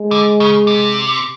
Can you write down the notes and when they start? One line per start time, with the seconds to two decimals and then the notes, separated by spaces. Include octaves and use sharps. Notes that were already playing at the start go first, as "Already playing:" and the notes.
Already playing: G#3
0.11 D3
0.40 C#3
0.67 C3